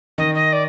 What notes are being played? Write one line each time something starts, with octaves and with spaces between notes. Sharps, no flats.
D#3 D#5
D#5
D5